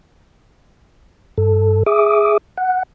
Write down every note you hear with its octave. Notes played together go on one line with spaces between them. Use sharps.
G2 A4
G#4 E5 D6 D#6
F#5